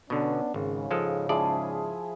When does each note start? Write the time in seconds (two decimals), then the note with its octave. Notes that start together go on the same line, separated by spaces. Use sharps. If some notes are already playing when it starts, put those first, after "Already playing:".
0.10 B2 D3 B3 C#4 D4
0.54 G#1 G#2 C#3
0.91 F3 G#3 A4
1.29 F3 E4 G#4 D5